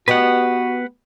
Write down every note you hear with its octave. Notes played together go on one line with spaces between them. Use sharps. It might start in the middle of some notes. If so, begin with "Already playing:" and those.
B3 F#4 G4 B4 D#5 F#5